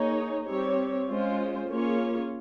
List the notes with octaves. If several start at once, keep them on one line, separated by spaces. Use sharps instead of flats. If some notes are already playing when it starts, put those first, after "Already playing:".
Already playing: A#3 D#4 G#4 C#5
G3 C4 G4 C#5
G#3 C#4 F4 C5
A#3 C#4 F4 G#4 C#5